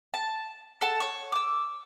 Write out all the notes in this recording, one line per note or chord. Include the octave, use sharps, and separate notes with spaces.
A5
A4 F#5 A5
C#5 C#6
D6 E6